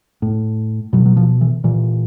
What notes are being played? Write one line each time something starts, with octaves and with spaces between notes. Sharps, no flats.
A2
B2 F#3
F#3
F3
E3
A#2 E3